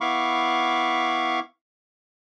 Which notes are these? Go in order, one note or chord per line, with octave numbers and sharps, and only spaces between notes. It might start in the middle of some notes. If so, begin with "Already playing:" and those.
B3 E4 F5 B5 C#6 D6